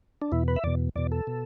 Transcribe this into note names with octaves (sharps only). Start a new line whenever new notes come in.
D4
E2 B2 E4
B4
E5
E2 B2 D5
E2 B2 D5
A4
B2